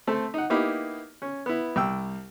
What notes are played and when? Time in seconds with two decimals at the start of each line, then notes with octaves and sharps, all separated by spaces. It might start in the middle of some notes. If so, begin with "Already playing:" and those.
0.07 A3 C4 A4
0.34 D#4 F#5
0.50 A#3 B3 D#4 E4 G4
1.22 C#4
1.46 B3 E4
1.76 C2 G5 E6